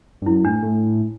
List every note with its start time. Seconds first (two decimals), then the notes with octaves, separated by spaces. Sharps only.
0.22 G2
0.26 F#2 E4
0.45 A2 D4
0.63 A2